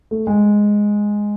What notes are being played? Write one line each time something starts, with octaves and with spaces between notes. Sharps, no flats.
A3
G#3